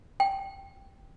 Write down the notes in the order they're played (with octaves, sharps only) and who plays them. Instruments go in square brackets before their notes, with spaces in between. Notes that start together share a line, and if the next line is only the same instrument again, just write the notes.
[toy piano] G5